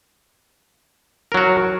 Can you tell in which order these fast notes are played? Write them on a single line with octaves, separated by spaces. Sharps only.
A#4 F#3 F#4